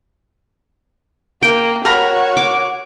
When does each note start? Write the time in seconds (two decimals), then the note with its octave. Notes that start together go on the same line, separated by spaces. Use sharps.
1.43 A#3 G5
1.85 F#4 A#4 C#5 A#5 B5
2.37 D6